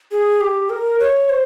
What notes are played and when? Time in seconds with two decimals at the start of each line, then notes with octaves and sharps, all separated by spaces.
0.12 G#4
0.41 G4
0.70 A#4
1.00 C#5
1.29 C5